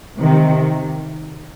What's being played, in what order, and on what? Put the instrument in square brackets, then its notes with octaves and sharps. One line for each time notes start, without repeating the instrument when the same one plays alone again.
[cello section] C3 D#3